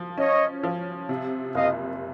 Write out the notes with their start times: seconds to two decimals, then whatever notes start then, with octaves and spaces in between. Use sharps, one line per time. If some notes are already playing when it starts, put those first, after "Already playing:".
Already playing: F3
0.18 C#4 C#5 D#5
0.63 F3
1.09 C3
1.55 F#1 D#5 F5